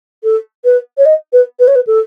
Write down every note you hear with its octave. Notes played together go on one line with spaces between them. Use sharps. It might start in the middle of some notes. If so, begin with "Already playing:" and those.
A4
B4
C#5
D#5
B4
B4
C#5
B4
A4